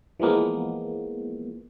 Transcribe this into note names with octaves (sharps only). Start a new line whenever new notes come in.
E3 F3 G#3 A#3 B3